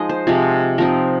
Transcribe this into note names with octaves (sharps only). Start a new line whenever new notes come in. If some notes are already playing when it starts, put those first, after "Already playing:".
Already playing: F3 G#3 D#4 D#5
C5
C3 F3 G#3
F3 C4 D#4 A#4